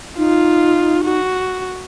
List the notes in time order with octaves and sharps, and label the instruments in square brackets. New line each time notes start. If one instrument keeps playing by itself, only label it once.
[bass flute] D#4 [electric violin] F4
[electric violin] F#4